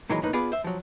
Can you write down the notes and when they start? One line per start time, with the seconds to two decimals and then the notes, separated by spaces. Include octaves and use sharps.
0.10 A#2 D#3 E3 F#3 G#3
0.22 B1 F2 A2 A#3 D#4 B4
0.33 B3 F4 G#4 B4 D5
0.52 C5 E5
0.64 F3 F#3